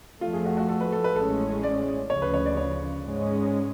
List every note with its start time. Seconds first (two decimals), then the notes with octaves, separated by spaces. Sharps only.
0.21 F2 F3 A3 F4
0.33 G#4
0.46 F#4
0.57 F#4
0.69 A4
0.81 B4
0.92 A4
1.04 B4
1.16 A1 A2 G#3 C#4 A4
1.63 D5
2.10 D2 C#3 F3 C#5
2.22 B4
2.34 C#5
2.45 D5
2.57 C#5
3.04 G#2 G#3 C#4